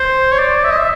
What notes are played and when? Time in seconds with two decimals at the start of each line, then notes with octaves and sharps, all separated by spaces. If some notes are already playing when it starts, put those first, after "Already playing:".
Already playing: C5
0.32 C#5
0.39 D5
0.64 E5
0.71 D#5
0.78 E5